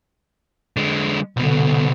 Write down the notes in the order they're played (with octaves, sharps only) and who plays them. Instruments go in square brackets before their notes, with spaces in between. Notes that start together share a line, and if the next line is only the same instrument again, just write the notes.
[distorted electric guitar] D3 G#3
[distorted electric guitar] C2 B2 [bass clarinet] D3